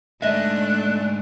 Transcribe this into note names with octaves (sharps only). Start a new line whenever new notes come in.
G#2 D3 A3 D4 D#5 E5 F#6